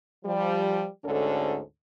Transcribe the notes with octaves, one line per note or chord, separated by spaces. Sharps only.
F3 G3
D2 G#2 D3 C#4 A4